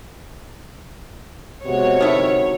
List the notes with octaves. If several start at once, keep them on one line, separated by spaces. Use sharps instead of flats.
C3 G#3 B3 F#4 C#5
C#2 D3 D#3 F#3 A3 E4